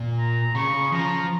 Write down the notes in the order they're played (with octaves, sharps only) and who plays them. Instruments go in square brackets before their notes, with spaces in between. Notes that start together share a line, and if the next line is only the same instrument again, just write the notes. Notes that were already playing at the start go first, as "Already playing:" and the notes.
Already playing: [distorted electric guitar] A#2
[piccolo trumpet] A#5
[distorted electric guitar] C#3 [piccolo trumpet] C#6
[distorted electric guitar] F3 [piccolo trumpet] A#5